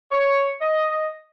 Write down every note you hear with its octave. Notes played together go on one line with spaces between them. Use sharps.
C#5
D#5